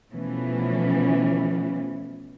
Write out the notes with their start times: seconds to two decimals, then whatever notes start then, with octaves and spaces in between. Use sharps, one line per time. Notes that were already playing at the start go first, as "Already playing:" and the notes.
0.12 B2 E3 F3 A3 B3 C#4